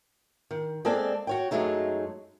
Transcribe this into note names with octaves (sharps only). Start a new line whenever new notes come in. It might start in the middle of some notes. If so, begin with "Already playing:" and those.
D#3
G#3 A#3 C4 A4 D5 G#5
F#4 C#5 G5
F#2 E3 F#3 G#3 A3 D#4